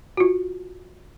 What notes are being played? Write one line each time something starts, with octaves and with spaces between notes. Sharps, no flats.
F4 F#4